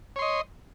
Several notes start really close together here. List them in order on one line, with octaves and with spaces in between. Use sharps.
C#5 C6 D#5